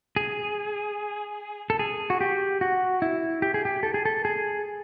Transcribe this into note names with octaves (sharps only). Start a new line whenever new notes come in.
G#4
A4
G#4
F#4
G4
F#4
E4
G4
G#4
G4
A4
G#4
A4
G#4